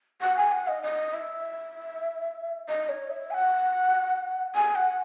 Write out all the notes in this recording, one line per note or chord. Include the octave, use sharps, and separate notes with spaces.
F#5
G#5
F#5
D#5
D#5
E5
D#5
C#5
E5
G#5
F#5
G#5
F#5